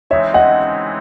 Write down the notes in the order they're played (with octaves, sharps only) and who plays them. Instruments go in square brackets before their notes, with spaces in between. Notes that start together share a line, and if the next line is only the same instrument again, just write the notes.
[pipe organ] E3 G#3 C4 D#4 [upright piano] C#5 E5
[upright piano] D#5 F#5